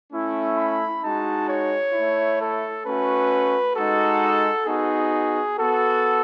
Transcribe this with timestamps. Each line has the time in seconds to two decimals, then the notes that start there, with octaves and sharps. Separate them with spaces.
0.12 A3 C#4 E4
0.57 B5
1.02 G#3 D#4 F#4 A5
1.49 C#5
1.93 A3 E4
2.40 A4
2.85 A3 C#4 F#4 B4
3.75 G#3 D#4 F#4 A4
4.66 B3 D#4 F#4 G#4
5.58 B3 F#4 A4